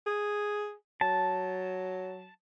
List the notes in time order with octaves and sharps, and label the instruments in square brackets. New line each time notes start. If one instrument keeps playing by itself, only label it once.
[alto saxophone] G#4
[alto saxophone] F#3 [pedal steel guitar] A5